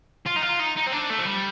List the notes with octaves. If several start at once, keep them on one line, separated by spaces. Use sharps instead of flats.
F4
D#4
F4
D#4
D#4
C4
D4
A3
F3
G3